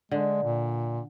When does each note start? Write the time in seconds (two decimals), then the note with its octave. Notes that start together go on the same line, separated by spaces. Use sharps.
0.11 D3 G#3
0.43 A#2